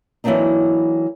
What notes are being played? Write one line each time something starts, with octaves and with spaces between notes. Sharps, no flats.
E3 F#3 A#3 C4 D4 D#4